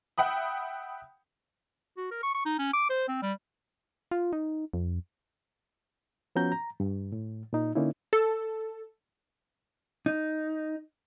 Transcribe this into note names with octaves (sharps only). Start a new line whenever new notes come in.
E5 F#5 G5 B5 D#6
F#4
A#4
C#6
C#6
D#4
C#4
D6
C5
C4
G3
F4
D#4
F2
F3 B3 C#4 F#4 A#5 G6
A#5
G2
A2
A#2 D#4
D3 A#3 C#4 D#4 E4
A4
D#4